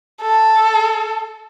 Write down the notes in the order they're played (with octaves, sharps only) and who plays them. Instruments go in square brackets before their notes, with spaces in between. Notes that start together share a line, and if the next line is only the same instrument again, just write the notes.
[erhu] A4